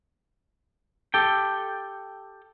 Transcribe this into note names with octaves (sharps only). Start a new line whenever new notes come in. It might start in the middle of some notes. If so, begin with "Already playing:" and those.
G4 A4 G5